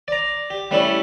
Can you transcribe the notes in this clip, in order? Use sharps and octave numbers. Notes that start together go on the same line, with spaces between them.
D5 A#5
G4
G3 A3 C#4 D4 E4 A4